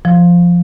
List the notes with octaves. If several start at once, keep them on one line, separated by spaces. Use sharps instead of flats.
F3